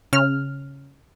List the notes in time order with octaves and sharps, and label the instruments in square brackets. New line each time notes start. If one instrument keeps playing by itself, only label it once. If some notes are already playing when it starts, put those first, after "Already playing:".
[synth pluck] C#3 F6